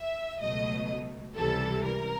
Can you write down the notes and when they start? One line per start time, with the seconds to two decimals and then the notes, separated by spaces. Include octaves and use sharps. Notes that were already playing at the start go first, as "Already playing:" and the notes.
Already playing: E5
0.41 C#2 B2 F#3 A3 D#5
1.36 C#2 C3 E3 G3 A4
1.84 A#4